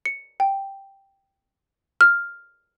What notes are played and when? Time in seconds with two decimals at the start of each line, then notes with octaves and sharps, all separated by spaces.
0.06 C#7
0.40 G5
2.01 F6